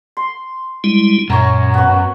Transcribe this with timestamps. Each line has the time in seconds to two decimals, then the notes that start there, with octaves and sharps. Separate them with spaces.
0.17 C6
0.84 G3 G#3 E4
1.30 F#2 A#2 C#5 A#5
1.74 B3 F#4